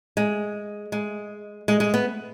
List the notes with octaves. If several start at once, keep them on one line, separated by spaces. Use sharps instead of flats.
G#3
G#3
G#3
G#3
B3